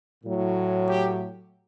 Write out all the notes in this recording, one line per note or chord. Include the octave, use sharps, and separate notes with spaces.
A2 F#3
G4